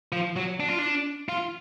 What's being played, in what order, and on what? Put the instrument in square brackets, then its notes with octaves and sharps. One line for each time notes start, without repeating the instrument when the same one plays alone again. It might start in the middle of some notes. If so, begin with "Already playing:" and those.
[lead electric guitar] F3
F#3
D4
F4
D4
F4